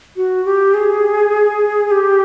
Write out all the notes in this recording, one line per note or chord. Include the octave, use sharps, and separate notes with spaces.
F#4
G4
G#4
G4